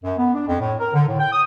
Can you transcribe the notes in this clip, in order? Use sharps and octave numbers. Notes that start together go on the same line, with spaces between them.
F#2
B3
D4
F2
A2
A#4
D3
A2
G5
D#6